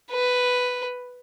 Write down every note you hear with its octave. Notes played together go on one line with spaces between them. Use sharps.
B4